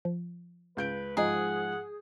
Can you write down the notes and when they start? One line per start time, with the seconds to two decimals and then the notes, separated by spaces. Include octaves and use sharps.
0.05 F3
0.77 C#2 B4 G6 D7
1.17 G#2 F3 G#3 G#4 D#5 F#5 G#5 A#5